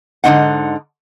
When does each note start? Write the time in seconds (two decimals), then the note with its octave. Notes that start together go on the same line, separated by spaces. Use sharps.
0.24 G#2 D3 F3 C4 D#4 F#5